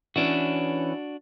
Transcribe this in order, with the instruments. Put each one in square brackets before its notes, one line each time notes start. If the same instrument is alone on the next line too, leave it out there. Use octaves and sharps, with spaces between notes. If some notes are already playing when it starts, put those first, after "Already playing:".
[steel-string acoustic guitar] E3 C#4 [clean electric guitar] D4 F#4